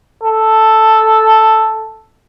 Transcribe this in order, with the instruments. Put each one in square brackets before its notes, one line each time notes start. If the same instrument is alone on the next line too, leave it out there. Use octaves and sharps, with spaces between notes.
[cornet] A4